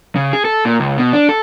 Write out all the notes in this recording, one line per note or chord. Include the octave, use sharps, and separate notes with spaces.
C#3
G#4
A4
A#2
C#2
B2
D4
A4